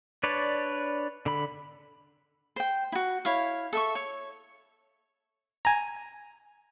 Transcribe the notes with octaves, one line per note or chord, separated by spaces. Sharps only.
D4 B4 C#5 D5
D3 B5
C5 G5
E4 F#4
E4 C#5 F5
A4 E5 C#6
C#5
G#5 A#5